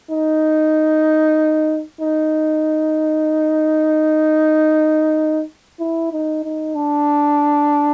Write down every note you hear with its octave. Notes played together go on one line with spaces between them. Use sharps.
D#4
D#4
E4
D#4
D#4
D4